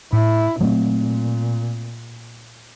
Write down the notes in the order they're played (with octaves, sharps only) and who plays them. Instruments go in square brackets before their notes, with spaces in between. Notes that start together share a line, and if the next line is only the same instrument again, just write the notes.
[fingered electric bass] A2 [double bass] E4
[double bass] A#2 [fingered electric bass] F#3 A3 C4